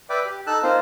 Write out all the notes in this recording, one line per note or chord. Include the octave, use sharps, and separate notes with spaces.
B4 D5 E5 G5 D6
G4
D#4 A4 A5 E6 F#6
A#3 C4 D#4 F4 C5